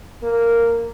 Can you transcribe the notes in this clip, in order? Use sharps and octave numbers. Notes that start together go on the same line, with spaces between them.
A#3